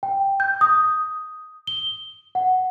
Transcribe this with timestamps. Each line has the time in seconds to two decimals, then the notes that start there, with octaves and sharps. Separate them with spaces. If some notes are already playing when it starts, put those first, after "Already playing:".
0.03 G5
0.40 G6
0.61 D#6
1.67 G7
2.35 F#5